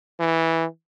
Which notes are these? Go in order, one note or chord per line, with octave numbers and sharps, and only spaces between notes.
E3